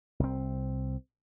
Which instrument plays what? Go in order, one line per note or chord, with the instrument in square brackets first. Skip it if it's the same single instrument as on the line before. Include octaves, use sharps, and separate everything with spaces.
[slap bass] C2 C4